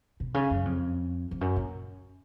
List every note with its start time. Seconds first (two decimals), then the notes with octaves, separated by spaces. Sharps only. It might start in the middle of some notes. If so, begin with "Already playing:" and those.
0.20 B2
0.34 C#3
0.50 F#2
0.65 F2
1.31 F2
1.41 F#2
1.56 A#2